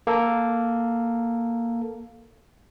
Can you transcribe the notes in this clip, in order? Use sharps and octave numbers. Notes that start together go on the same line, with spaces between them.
A#3 A4